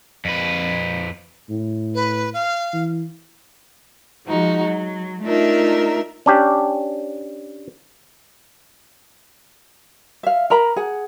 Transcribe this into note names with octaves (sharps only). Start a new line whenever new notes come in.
F2 B4
A2
B4
F5
E3
F3 G#3 D#4 F#4
F#3
A3 D4 D#4 F4 A#4 E5
C#4 D4 G4
E5 F5
A#4 A#5 B5
G#4 F#5